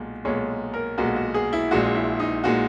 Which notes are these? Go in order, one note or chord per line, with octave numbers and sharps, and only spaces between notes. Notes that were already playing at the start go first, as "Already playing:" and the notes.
Already playing: B1 A#2 G#3
B1 A#2 G#3 C#5
A#4
B1 A#2 G#3 F#4
F#4
G#4
E4
A#1 A#2 G#3 F#4
E4
D#4
A#2 G#3 F#4